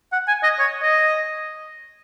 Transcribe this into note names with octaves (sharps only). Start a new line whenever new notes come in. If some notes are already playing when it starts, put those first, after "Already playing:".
F#5
G#5
D#5
C#5
D#5